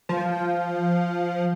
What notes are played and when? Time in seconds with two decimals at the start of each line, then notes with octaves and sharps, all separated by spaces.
0.09 F3